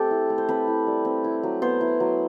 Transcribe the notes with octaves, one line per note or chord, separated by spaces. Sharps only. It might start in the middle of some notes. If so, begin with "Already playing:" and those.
Already playing: A3 C4 G4 A4
E4
A3
C5
C4 B4
E4
G3
C4
E4
F#3
B3 C5
E4
F#3